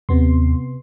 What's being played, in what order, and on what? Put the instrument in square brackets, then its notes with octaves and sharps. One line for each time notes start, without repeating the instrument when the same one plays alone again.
[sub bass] D#2 [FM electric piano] C3 B3 C6